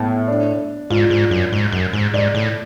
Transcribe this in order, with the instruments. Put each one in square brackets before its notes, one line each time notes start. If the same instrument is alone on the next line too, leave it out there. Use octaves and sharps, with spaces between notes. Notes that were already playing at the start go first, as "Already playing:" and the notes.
Already playing: [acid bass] A2 [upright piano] B3
[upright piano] D4
[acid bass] G#2 [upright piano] F4
[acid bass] G#2
F#2
G#2
F#2
G#2
[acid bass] G#2 [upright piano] D5
[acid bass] A2